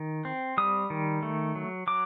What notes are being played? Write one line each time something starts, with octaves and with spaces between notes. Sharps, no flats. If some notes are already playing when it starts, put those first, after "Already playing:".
Already playing: D#3
C4
G3 D#6
D#3
A3
F#3
F#3 D6